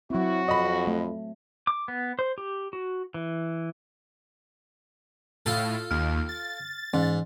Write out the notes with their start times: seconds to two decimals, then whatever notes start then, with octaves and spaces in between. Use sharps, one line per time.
0.10 F#3 C4 E4 F#4
0.48 F2 D#5 B5
0.87 A3
1.67 D6
1.88 B3
2.19 C5
2.38 G4
2.73 F#4
3.14 E3
5.46 A2 F4 A4
5.91 D#2 F6
6.29 A6
6.94 G#2 E3